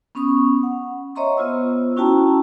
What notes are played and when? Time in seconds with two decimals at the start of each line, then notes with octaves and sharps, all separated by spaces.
0.15 B3 C#4 B5 C#6 D#6
0.63 F#5
1.15 C#5 D#5 E5 A#5 C6 C#6
1.37 B3 F4 C5 E6
1.97 C#4 E4 F#4 G5 A5 A#5